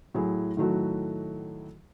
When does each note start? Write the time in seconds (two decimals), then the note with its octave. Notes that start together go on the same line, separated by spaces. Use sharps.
0.15 A2 F#3 E4 G#4
0.57 A2 D#3 F#3 A3 F#4